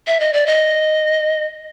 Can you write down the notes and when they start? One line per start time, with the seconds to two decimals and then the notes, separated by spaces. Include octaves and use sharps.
0.07 E5
0.20 D#5
0.33 D5
0.46 D#5